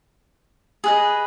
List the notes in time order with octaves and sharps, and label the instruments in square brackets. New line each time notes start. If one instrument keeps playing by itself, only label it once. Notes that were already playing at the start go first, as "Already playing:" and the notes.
[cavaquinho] G#4 B4 D#5